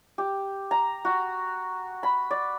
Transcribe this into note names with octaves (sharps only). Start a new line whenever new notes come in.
G4
A#5
F#4
B5
D5